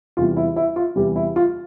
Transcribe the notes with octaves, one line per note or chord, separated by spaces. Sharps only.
E2 C3 E3 G3 F4
E4
E4
F4
E2 C3 E3 G3 G4
E4
F4